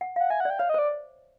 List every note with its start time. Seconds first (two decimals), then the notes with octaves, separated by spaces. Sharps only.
0.01 F#5
0.16 F5 F#5
0.30 E5 G#5
0.40 F#5
0.45 D5 G5
0.59 C#5 F5
0.69 D#5
0.74 C5 D5